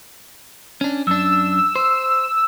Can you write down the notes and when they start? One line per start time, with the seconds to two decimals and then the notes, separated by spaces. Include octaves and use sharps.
0.81 C#4 D4
1.07 F#2 D4 E6
1.76 C5